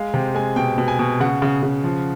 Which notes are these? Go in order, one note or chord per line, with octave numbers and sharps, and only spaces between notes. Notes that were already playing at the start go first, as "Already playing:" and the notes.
Already playing: G#3 F5
C3 G5
G#3 G#5
B2 G5
B2
G#5
B2
C#3 F#5
C#3
C#3
F3